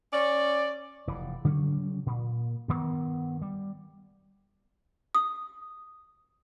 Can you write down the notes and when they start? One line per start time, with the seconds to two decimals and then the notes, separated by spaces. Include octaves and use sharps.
0.13 C#4 D5
1.07 F1 E3
1.45 C#3 F#3 G3 C#4
2.06 A#2
2.68 G2 D#3 B3
3.42 G3
5.15 D#6